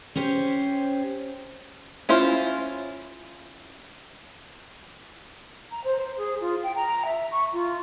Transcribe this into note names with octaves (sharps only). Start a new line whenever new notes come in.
C#4 G4 C5
C#4 E4 F4 C5
A#5
C5
C5
G#4
F4
G5
A#5
E5
C#6
F4